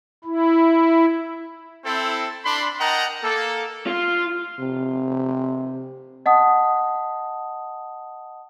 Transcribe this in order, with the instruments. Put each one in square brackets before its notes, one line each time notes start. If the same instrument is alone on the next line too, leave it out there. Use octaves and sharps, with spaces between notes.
[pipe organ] E4
[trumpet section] C4 E4 A4
D4 B5 C6
A#4 D#5 F#5 G5 A5 A#5
A#3 A4
[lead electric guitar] F4
[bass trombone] C3
[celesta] D#5 F#5 A5 D#6